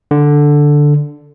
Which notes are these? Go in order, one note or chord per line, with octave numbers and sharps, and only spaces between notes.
D3